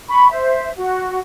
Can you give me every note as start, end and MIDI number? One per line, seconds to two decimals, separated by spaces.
0.08 0.29 83
0.08 0.29 85
0.30 0.69 72
0.30 0.69 76
0.75 1.19 66